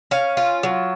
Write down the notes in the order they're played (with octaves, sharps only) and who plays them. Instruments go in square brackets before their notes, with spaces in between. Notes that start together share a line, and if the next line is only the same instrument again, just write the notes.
[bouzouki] C#4 F5
F4
F#3